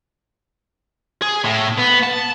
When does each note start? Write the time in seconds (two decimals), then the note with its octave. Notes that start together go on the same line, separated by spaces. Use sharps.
1.22 G#4
1.44 A2
1.78 B3
2.03 A5